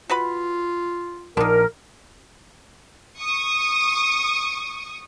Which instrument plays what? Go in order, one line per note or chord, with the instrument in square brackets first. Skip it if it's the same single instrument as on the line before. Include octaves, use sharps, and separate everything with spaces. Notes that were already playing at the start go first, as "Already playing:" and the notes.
[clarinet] F4 [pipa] F#4 B4 B5
[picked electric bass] A#1 [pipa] D4 D#4 [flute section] A#4
[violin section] C#6 D#6